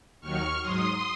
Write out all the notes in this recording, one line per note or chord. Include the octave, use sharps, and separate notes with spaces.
D#2 D#3 F#3 C#6 F6
G#2 F#3 C6 D#6